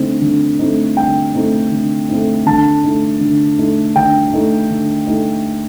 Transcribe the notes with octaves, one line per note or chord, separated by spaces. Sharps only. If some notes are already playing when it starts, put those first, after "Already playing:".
Already playing: D3 A3 C4 D#4
D3
A3 C4 D#4
D3 G5
A3 C4 D#4
D3
A3 C4 D#4
D3 A5
A3 D#4
D3
A3 D#4
D3 G5
A3 D#4
D3
A3 D#4